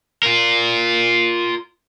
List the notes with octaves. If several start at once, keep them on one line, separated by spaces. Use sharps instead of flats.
F4 A#4